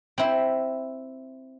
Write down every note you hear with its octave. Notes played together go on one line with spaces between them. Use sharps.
C4 E4